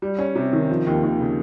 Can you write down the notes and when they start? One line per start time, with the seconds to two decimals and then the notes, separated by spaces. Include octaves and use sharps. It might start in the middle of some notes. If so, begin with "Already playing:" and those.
0.02 G3
0.19 C#4
0.35 C3
0.53 D#3
0.70 F3
0.86 D#2
1.03 D#2
1.20 C#3